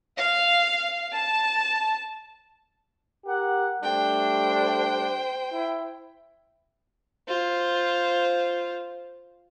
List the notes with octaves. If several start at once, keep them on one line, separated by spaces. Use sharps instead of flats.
F5
A5
G4 A#4 F#5
G3 A3 D4 C5 G5
E4
F4 C5